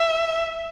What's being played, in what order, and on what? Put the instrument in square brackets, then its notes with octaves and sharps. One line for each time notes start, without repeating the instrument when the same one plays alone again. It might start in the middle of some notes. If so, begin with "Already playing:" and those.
Already playing: [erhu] E5